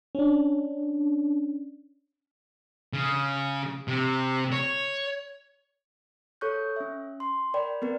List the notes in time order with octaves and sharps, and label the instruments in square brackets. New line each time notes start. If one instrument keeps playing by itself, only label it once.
[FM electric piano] C#4 D4
[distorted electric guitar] C#3
C3
C#5
[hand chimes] A4 C#5 C#6 F#6 G6
C#4 E5
C6
A#4 D5 G5 B5
B3 C4 A#4 B4